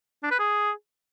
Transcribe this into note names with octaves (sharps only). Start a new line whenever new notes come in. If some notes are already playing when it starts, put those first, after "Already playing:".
D4
B4
G#4